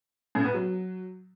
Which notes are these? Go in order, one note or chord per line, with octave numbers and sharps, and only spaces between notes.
A2
B3
F#3